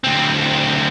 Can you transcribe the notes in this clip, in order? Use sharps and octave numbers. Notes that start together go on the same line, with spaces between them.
D2 C4